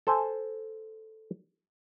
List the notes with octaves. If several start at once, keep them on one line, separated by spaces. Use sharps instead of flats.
A4 C5 G#5